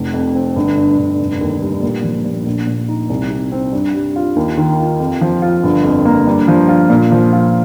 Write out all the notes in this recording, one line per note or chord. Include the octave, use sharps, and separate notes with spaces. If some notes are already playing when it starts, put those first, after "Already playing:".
Already playing: F1
F2
C4
G1
G2
G1
F1
D#2
G3
A#2
F3
A#2
A#1
A#2
D#4
C2
C3
C4
G2
G3
F4
D#2
D#3
F4
F2
F3
F4
G1
F2
A#3
G2
F3
F4
A#2
F3
F4